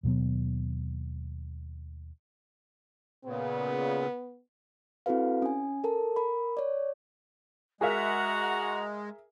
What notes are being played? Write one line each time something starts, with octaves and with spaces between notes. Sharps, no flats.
D#2 B2 F#3 B3
A#2 C#3 B3
C4 E4 F#4 A4 B4 F5
C#4 G#5
A4 A#4 A5
A#4 B5
C#5 D5
G#3 F#4 G#4 A#4 E5 F#5 A#5